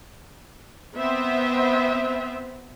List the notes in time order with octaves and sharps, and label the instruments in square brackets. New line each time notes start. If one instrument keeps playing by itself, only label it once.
[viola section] B3 C4 C5 E5